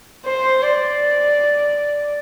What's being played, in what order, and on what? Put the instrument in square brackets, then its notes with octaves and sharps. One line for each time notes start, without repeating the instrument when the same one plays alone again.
[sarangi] C5
D5